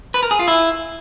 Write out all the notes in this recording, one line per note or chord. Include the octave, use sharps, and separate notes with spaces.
B4
A#4
G#4
F4
E4